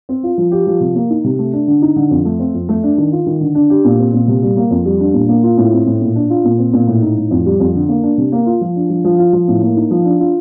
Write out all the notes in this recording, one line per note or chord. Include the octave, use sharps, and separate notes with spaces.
C4
F4
F3
G4
F3
C3
A#3
D#4
C3
A3
D4
D3
D#4
D3
F2
A3
C4
F2
A3
D4
D#3
F4
D#3
D3
D4
G4
A#2
C4
A#2
C3
G3
A#3
F2
G3
D4
A#2
A#3
F4
A2
C4
A2
A#2
D4
F4
A#2
C4
A#2
A2
D#4
A2
F2
G3
F2
D3
A#3
D4
C3
A#3
F4
F3
D4
F3
F3
F4
F3
A2
A#3
D#4
F3
D4
F4